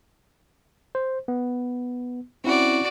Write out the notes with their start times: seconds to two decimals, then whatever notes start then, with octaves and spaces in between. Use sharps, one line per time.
0.95 C5
1.28 B3
2.44 C4 C#4 E4 F#4 D5